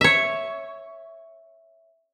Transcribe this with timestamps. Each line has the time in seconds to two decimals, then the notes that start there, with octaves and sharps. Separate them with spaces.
0.01 C#5 E5